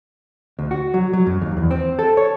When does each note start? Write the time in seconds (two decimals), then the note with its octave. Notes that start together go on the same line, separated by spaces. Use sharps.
0.59 D2
0.71 F#4
0.94 F#3
1.13 F#3
1.27 F#2
1.41 D#2
1.57 E2
1.71 C4
1.99 A4
2.17 C#5